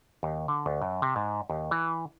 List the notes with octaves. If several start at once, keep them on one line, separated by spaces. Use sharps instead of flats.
D#2
D3
D2
F#2
C3
G#2
D#2
E3